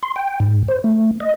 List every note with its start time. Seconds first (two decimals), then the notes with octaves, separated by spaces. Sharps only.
0.03 C6
0.16 G5
0.40 G#2
0.68 C5
0.84 A3
1.20 D#5